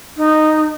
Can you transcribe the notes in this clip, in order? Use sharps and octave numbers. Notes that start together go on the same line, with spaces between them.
D#4